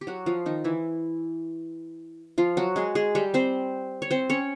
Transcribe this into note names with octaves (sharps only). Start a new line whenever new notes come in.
G4
F#3 F#4
F3 F4
D#3 D#4
E3 E4
F3 F4
F#3 F#4
G#3 G#4
G#3 G#4
G3 G4
C4 C5
C#5
C4 C5
C#4 C#5